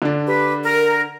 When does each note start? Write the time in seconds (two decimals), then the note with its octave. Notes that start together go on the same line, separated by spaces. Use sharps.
0.02 D3 D4
0.27 G4 B4
0.65 A#4